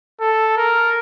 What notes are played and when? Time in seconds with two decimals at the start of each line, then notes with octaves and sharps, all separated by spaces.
0.20 A4
0.57 A#4